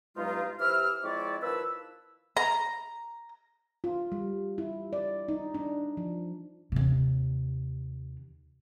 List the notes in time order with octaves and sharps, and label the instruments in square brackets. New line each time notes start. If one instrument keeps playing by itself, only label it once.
[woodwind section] G2 B2 F#3 G#3 D#4 F4
E3 E4 G4 C5 E6 F6
F3 G#3 C4 E4 C#5 D5
D#3 F3 E4 B4 E6
[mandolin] A#5
[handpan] F4
G3
E4
D5
D#4
D4
F3
[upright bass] D#2 C3